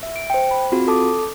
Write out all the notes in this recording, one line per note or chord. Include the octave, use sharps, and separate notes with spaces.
E5
D7
C5 G5
B5
C4 F4 F#4 G#4
A4 A5 D6